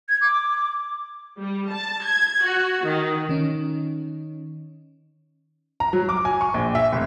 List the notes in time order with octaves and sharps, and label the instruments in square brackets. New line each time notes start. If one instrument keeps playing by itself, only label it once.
[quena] G#6
D6
[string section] G3
A5
G#6
F#4
D#3
[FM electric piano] D#3 C#4
[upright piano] A#5
F#3
D6
G#5
C#6
A#1
E5
F1